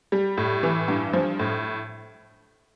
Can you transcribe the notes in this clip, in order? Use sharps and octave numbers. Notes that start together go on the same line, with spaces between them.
G3
A2
E3
G2
F3
A2